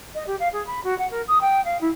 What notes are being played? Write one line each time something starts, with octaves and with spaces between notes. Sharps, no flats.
D#5
G4
F5
G#4
B5
F#4
F#5
A#4
D#6
G5
F5
E4